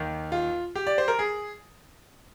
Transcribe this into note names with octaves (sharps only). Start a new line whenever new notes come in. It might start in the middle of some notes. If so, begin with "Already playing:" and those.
Already playing: D#2 D#3
F4
G4
D5
C5
A#4
G#4